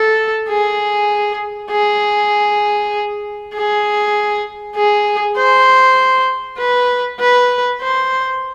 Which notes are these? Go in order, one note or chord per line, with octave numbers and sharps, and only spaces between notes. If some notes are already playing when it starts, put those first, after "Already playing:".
Already playing: A4
G#4
G#4
G#4
G#4
C5
B4
B4
C5